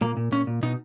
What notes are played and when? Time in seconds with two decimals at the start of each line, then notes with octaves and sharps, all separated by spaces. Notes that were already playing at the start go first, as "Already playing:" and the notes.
0.01 A#2 A#3
0.17 A#2
0.32 A#2 C#4
0.47 A#2
0.63 B2 D#4